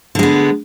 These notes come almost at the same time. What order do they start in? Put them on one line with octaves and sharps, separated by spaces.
D3 G#3 B3